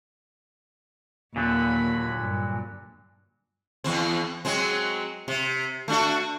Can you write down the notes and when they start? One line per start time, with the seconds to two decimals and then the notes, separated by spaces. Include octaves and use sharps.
1.36 D#2 A#2 D3 F#3 B5
2.21 G2
3.84 E2 C4
4.45 F#3 G#3 C4
5.28 C3
5.88 A3 D4 F#4